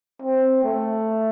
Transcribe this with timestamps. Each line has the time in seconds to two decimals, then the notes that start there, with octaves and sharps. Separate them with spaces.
0.22 C4
0.64 A3